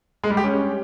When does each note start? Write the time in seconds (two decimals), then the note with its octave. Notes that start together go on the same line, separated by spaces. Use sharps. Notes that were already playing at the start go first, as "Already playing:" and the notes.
0.24 G#3
0.30 G3
0.37 G4
0.44 C#4